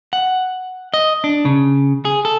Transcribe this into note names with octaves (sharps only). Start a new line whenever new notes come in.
F#5
D#5
D4
C#3
G#4
A4